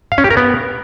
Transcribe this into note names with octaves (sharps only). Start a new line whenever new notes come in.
F5
C#4
G4
A#4
B3